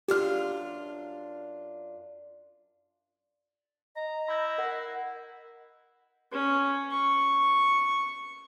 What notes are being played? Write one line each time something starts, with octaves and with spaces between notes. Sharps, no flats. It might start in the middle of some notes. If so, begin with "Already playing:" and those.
F#2 D4 F4 G4 F6
D#5 A#5
E4 B5 G6 A#6
A#4 F#5
C#4
C#6